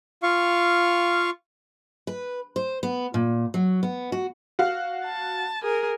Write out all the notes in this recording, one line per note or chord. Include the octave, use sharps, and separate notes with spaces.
F4 F5 C#6
B4
C5
B3
A#2
F#3
B3
F#4
F#4 F5
A5
G#4 A#4